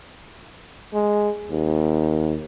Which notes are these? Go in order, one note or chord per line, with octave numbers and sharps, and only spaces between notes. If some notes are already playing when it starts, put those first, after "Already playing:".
G#3
D#2